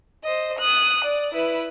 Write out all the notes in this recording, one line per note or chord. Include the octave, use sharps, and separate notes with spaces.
C5 D#5
D#6 F#6
D5
E4 B4